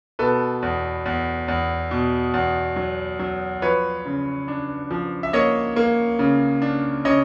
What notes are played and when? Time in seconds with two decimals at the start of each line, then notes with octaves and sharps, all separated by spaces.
0.19 B2 A4 B4
0.62 E2
1.06 E2
1.48 E2
1.91 B2
2.34 E2
2.76 F#3
3.19 F#3
3.62 F3 B4 C#5
4.05 C#3
4.48 D4
4.91 F3
5.23 E5
5.33 A#3 C#5 D#5
5.76 A#3
6.19 C#3
6.62 D4
7.05 C#3 C#5 D#5